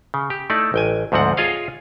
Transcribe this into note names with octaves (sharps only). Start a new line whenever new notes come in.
C#3
G4
A3 D#4 E4 A4 D5
A1 G5 G#5
D2 G#2 F3 C4 F#5
F4 G#4 C#5 D#5 F5